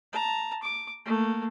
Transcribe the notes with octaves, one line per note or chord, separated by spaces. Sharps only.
A5 A#5
D6
A3 A#3